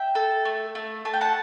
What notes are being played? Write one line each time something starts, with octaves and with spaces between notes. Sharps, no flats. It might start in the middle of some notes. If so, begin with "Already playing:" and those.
Already playing: E5 G5
A4
A3
A3
A3 A5
G5
F#5 A5